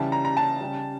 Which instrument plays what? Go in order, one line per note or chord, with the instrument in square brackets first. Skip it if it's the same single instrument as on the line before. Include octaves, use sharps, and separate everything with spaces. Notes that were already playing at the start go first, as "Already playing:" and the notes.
Already playing: [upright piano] C#3 E3 G3 A5
A#5
A#5
A5
C#3 G3